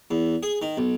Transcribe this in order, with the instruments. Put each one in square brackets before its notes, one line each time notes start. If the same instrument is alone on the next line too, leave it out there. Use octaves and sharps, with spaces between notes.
[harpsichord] E2
G#4
D#3
B1